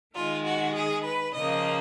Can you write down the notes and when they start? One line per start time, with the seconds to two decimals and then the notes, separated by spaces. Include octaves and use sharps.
0.15 D#3 G#3 F4
0.45 F#4
0.75 G#4
1.05 B4
1.34 C#3 F3 A#3 D#5